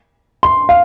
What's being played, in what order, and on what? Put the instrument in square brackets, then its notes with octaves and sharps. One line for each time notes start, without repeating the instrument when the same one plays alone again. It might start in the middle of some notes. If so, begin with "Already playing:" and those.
[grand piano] C6
F5